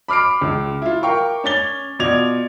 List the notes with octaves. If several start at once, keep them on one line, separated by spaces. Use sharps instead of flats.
B5 D6 F6 C7 D7
C#2
E4 F4
A#4 F5 G5 C#6
C#4 C#5 A6 G7
B2 F4 D5 G#6 F7